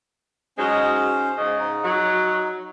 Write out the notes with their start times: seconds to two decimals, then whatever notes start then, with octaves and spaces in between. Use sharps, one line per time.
0.58 F#3 G#3 C#4 D#4 C5
1.38 G#2 C#3 D#5
1.59 D#4
1.84 F#3